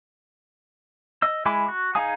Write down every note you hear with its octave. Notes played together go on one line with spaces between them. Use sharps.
D#5 E6
G#3 E4 G#5 B5 D6
F#4
D#4 G#4 F5 G#5 D#6